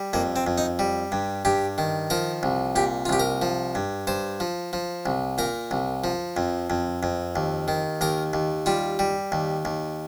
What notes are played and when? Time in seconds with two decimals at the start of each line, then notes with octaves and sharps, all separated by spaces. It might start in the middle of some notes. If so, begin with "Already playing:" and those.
Already playing: G3
0.13 F2 A#3
0.36 C4
0.47 F2
0.58 D#4
0.79 G3
1.12 G2
1.45 G2 G4
1.78 D#3
2.10 F3 A#4
2.43 C2
2.76 A#2 G4
3.06 F4
3.09 C2 G4
3.20 A#4
3.42 F3
3.75 G2
4.07 G2 C5
4.40 F3
4.73 F3
5.06 C2
5.38 A#2 A#4
5.71 C2
6.04 F3
6.37 F2
6.70 F2
7.03 F2
7.36 D#2
7.68 D#3
8.01 D#2 A#4
8.33 D#2
8.66 G3 F4
8.99 G3
9.32 D#2
9.65 D#2